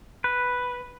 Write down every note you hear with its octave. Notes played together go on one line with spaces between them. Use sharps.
B4